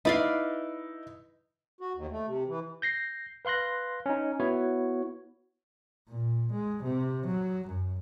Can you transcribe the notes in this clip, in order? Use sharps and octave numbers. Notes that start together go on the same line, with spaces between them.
D#4 E4 B4 D5 F5
F#4
D#2
A3
C3
E3
G6 A#6 C7
B4 F5 C6 F#6 A#6
C#4 D#4
B3 E4 F#4 C#5
A#2
G#3
C3
F#3
F#2